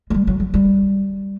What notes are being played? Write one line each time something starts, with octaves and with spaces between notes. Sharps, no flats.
G#3
G3
F#3
F#3
G3